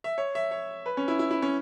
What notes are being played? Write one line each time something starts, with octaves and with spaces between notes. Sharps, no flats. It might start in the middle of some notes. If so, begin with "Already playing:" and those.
E5
C#5
E5
C#5
B4
C#4
E4
E4
E4
C#4